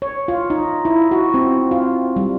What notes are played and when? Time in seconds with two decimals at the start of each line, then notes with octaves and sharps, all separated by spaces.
0.02 C#5
0.28 F4
0.50 D#4
0.85 E4
1.11 F#4
1.34 C4
1.71 F4
2.16 G3